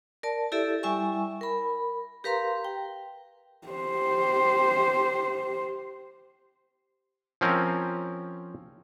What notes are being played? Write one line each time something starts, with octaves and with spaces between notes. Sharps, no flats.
A#4 D5 A5
E4 G4 A4 D5 E5
G3 E4 E5 G#5 C#6
A#4 B5
G4 A#4 B4 F5 A#5 C6
G5
G4 C5
F3 C4 C#4 A#4